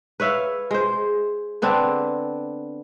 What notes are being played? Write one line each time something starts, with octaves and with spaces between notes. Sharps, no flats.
B4 C#5 E5 F5
G#3 C5
D3 B3 C4 D4